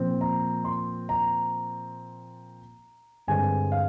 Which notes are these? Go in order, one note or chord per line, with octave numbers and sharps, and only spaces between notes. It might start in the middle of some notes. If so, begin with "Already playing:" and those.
Already playing: A#2 F3 C4
A#5
C6
A#5
G2 D3 G#3 C4 G#5
F5